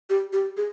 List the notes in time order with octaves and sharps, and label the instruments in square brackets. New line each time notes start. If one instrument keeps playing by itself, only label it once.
[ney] G4
G4
G#4